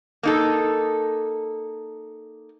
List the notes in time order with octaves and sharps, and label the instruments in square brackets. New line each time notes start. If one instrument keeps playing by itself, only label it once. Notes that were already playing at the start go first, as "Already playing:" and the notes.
[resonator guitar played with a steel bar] A#3 D#4 A4